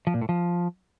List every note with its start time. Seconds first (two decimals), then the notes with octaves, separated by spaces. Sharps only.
0.07 F3
0.14 A#2
0.22 A2
0.29 F3